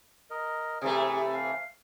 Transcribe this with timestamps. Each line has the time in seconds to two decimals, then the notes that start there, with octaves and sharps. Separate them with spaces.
0.30 A#4 D#5
0.82 C3 E3 A3 G#4
1.34 F5